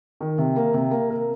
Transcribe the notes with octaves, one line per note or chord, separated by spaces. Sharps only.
D#3
C3
A#3
C3
A#3
A#4